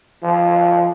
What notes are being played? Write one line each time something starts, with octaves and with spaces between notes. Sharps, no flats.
F3